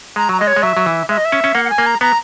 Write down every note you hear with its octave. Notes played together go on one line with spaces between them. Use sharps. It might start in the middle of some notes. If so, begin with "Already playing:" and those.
G#3 A#5
F#3 A#5
G#3 D#5
C#5
G#3
F#3 E5
F#3
E3
G#3 E5
D#5
E5
C#4
C#4
A#3 F#5
F#5
G#5
A#3
A#5
B3 A#5